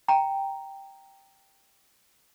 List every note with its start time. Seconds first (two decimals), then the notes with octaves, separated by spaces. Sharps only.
0.08 G5 A#5